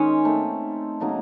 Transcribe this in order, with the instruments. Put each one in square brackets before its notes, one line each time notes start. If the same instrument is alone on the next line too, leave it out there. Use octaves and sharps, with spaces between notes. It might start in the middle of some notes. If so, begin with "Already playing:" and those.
Already playing: [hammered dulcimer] D#3 G#3 [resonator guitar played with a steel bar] C#4
[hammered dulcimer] A3 C4 D#4
C#3 F#3 A#3 D#4